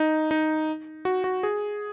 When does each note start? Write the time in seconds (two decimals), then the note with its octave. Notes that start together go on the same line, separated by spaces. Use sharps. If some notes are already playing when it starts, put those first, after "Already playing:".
Already playing: D#4
0.31 D#4
1.05 F#4
1.24 F#4
1.43 G#4